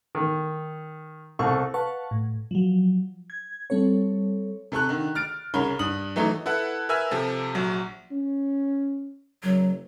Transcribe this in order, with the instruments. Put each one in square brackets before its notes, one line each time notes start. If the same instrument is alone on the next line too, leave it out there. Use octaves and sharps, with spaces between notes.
[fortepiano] D#3
C2 A4 C#6
[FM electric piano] B4 F5 F#5 A5 C#6
A2
F3 F#3
G#6
G3 C4 A4 C#5
[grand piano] C3 A4 C#6 F#6
D3 D#3
F6 A6 D7
C2 C#3 A#4 C#5 B5 G7
G2 D#6 F#7
E3 F#3 A3 D#4
[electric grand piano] E4 A4 B4 F#5
A#4 B4 E5 G#5 E6
C3 F3 G4 A4
A#1 F#3
[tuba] C#4
[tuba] F#1 [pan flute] F#3